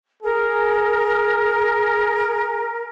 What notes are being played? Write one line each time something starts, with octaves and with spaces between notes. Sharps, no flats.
G#4 A#4